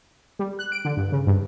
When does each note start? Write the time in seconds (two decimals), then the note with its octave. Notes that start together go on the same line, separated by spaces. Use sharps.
0.39 G3
0.59 F#6
0.72 D7
0.85 D3
0.97 G2
1.12 C#3
1.27 G2